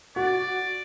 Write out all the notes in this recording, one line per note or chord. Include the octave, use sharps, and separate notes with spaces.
F#4 D5